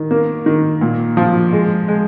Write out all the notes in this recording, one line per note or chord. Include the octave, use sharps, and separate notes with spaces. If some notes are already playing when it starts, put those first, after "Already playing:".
Already playing: D#3
A#3
D#3
A#2
F3
G#3
G#3